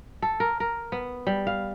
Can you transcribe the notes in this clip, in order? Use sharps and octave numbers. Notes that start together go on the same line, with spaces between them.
A4
A#4
A#4
B3
G3
F5